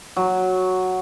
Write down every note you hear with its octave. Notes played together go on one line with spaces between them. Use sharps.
F#3